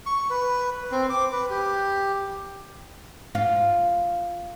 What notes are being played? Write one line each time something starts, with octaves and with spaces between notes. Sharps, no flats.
C#6
B4
C4
D6
B4
G4
F4